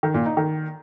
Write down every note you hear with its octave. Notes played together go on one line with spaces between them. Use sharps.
D#3
A#2
D#4
D#3